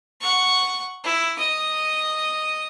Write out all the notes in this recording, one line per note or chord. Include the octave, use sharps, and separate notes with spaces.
F#5 C#6
E4
D#5 D#6